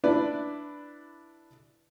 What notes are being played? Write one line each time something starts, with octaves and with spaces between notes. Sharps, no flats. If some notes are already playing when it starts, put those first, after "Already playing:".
D4 E4 B4 D5